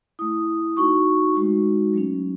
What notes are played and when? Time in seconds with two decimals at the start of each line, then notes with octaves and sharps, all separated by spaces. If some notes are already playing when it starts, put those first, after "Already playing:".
0.19 A3 E4 D#6
0.77 A3 D#4 F#4 C#6
1.35 G#3 D#4 F#4
1.93 F#3 A3 C#4